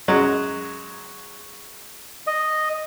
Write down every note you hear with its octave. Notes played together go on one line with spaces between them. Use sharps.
F#2 F#3 G#3
D#5